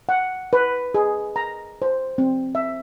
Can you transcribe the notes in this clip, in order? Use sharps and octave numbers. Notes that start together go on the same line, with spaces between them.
F#5
B4
G#4
A#5
C5
C4
E5